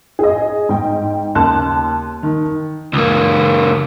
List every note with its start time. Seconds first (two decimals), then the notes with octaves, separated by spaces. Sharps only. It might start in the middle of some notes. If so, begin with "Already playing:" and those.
0.19 G#4 D#5
0.69 G#2 G5
1.35 D#2 C#3 A5 C6 F#6
2.23 D#3
2.93 C#2 A#3